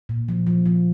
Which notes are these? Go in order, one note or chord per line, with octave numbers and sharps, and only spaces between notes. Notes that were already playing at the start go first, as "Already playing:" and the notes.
A#2
F3
F3
F3